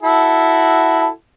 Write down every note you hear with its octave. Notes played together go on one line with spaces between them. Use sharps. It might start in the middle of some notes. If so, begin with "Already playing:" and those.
E4 F#4 A4